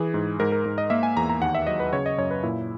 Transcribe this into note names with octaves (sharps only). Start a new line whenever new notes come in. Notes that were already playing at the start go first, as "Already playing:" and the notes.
Already playing: E3 G#4
G#2
G#2 A#4
A#4
G#2
D#5
A#3 E5
G#5
E2 A#5
A#5
D#2 F#5
E5
F#3 D#5
B4
C#3 C#5
D#5
F#2 C#5
B4
A#2 E4